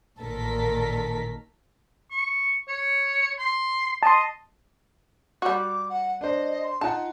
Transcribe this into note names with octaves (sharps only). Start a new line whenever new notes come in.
A1 A#2 D#3 A4 A#4 B6
C#6
C#5
C6
D#5 A5 C6
G3 F#4 D6
F#5
D4 C5 D#5
C6
D#4 F4 F#5 A5